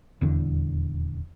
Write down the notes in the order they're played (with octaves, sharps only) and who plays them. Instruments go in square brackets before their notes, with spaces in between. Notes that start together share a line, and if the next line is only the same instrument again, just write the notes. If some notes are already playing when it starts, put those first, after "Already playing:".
[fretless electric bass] D#1 E2 D3